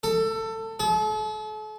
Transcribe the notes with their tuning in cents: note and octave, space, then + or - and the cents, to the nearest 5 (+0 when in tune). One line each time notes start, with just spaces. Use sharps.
A4 +20
A4 -40